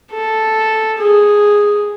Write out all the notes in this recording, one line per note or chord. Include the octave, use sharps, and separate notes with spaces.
A4
G#4